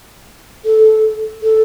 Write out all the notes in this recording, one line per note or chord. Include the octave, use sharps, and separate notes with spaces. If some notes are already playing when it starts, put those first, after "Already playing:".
A4
A4